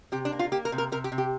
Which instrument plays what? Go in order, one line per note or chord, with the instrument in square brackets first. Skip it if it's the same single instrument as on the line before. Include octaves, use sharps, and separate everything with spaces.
[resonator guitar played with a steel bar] C3 G4
D4
A#3
F4
A#3 G4
A#4
C3
A#4
C3 A#4
G4
C3
G4